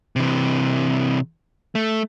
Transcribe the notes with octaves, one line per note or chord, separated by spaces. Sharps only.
C3 E3
A3